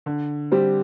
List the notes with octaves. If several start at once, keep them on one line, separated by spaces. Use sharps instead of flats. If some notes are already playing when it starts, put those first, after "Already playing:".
D3
G3 C4 G4